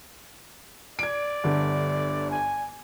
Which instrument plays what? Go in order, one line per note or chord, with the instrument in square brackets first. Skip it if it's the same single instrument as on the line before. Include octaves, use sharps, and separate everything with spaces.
[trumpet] D5 [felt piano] G#6 D7
[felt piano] G1 D3
[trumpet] G#5